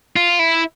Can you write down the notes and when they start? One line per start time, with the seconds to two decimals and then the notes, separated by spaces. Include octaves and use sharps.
0.16 F4
0.39 E4